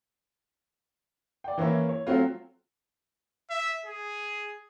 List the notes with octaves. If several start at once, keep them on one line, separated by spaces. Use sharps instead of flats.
D5 G5
E3 A#3 C#4 C#5 E5
C#5
F#3 A3 C4 F4
E5
G#4